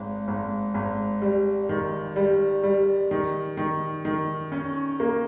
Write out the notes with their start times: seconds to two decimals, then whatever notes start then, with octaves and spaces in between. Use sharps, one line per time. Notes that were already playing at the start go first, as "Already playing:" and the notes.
Already playing: G#1
0.28 G#1
0.74 G#1
1.22 G3
1.69 D#3
2.16 G3
2.63 G3
3.11 D#3
3.57 D#3
4.05 D#3
4.52 C#4
5.00 A#3